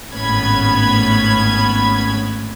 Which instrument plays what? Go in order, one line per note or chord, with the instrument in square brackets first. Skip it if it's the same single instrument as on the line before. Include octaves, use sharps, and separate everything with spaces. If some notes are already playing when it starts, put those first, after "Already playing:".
[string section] G#1 A2 B3 C#4 B5 G#6